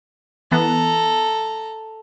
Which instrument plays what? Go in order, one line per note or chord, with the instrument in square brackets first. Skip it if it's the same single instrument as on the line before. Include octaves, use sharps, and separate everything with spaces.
[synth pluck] E3 B3 [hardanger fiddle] A4 A#5